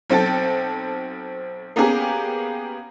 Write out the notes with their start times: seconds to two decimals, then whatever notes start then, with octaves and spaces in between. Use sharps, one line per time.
0.10 B1 C4 A4 G5 A6
1.76 A#3 B3 C#4 G4 G#4 A#4